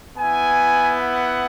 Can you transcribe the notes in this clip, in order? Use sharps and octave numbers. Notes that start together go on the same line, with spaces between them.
B3 E4 G#5
F#5